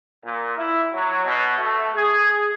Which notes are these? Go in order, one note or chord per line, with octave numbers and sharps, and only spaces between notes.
A#2
E4
F#3
B2
A3
G#4